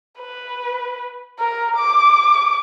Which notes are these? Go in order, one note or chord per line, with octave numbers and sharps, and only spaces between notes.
B4
A#4
D6